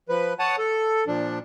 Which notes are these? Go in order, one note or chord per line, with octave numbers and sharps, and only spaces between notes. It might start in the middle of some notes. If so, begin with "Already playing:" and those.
F3 B4
C#5 F#5 A5 D#6
A4
A#2 F3 D4